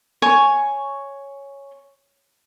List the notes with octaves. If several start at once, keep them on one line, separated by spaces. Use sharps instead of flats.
C#5 G#5 C#6